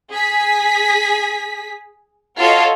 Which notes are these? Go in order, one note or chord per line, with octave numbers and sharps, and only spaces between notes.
G#4 B6
F4 F#4 A4 C#5 D#5 F5